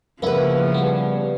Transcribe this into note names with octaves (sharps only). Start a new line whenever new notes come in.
C#3 F3 A#3 B3 C#4 E4 B4
G3 B3